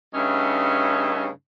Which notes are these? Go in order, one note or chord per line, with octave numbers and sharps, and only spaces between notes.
G2 C#3 A3 C#4 D#4